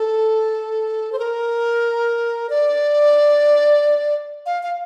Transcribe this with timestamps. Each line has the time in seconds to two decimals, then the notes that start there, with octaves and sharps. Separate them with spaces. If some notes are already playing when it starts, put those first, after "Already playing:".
Already playing: A4
1.12 C5
1.19 A#4
2.50 D5
4.46 F5
4.63 F5